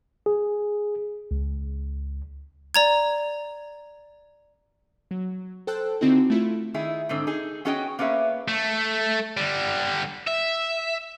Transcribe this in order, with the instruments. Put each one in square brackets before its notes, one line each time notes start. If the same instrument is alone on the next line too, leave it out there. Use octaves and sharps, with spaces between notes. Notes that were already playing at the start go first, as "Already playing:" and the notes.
[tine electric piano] G#4
C#2
[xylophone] D5 A#5 G#6
[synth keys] F#3
A4 C5 G5 A5 E6 F#6
D3 C4 D#4 E4 F#4
A3 E4 F4
[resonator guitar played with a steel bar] D#3 D#4 E4 G#4
G#2 D3 C4
D#4 G#4
B3 C#4 F#4 G#4 D#5 G5
A#3 B3 C#4 G#4 E5
[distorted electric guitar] A3
D3 G3
E5